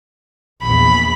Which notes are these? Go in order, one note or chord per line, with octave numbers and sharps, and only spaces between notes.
A#1 E2 B5